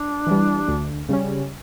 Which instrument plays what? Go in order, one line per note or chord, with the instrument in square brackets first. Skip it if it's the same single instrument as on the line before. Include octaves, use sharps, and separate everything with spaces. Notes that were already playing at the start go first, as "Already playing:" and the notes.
Already playing: [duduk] D4
[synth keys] E3 G3
D2
C#3 G3 C#4